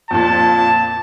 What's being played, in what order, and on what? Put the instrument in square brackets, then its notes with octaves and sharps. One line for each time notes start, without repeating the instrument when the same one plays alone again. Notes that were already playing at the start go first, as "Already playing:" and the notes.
[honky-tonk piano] F2 A#2 [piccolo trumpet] A5